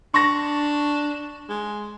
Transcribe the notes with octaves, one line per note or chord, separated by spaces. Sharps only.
D4 C#6 A#6
G#3